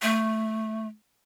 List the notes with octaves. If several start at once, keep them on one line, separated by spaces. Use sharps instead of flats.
A3